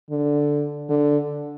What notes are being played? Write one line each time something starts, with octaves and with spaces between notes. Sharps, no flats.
D3
D3